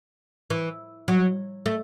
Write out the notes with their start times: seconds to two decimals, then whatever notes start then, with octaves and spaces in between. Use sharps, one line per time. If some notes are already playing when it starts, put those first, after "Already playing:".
0.50 E3
1.08 F#3
1.66 A3